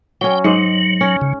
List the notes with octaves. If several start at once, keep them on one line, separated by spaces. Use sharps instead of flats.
F#3 C#4 G5
G#2 F#3 C5 D#5
C#4
C#3